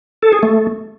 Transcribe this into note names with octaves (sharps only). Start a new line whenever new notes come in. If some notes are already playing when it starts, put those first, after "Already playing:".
A4
G#4
A3